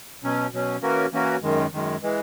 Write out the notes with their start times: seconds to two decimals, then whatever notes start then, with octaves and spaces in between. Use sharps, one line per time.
0.23 B2 F#3 C#4
0.53 B2 F#3 C#4
0.82 E3 A#3 C#4 F#4 A#4
1.12 E3 A#3 C#4 F#4 A#4
1.42 F#2 D#3 G#3
1.72 F#2 D#3 G#3
2.02 E3 G#3